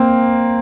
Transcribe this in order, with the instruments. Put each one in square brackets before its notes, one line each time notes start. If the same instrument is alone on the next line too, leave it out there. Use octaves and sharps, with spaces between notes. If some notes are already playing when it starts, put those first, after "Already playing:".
Already playing: [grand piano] A#3 C4